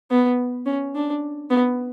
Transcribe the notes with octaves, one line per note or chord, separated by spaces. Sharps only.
B3
C#4
D4
B3